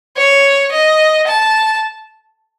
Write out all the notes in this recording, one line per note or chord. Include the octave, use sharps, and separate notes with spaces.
C#5
D#5
A5